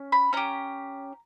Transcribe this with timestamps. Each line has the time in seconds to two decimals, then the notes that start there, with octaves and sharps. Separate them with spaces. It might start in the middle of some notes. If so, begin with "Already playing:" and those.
Already playing: C#4
0.12 B5
0.33 C#4 G4 A#5